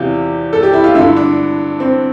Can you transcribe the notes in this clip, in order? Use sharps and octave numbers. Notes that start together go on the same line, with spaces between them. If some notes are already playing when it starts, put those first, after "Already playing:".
Already playing: E2 C3 E3 F4 G4
A4
G4
E4
F4
G2 D3 E4
D4
C4